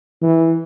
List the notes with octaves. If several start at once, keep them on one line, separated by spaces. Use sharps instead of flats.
E3